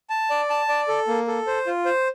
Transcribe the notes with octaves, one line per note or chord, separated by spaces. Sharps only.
A5
D5
A5
D5
A4
A#3
A4
C5
F4
C5